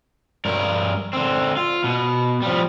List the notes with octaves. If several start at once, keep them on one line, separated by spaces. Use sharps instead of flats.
G2 A#4
D3 C4
F4
B2
F3 G3